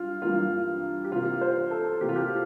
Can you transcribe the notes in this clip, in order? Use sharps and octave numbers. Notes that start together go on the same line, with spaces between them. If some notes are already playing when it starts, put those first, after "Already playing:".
Already playing: G2 F4
G2 E3 A#3 F4
G4
C3 E3 A#3 F4
C5
A4
C3 E3 A#3 G4
F4
G4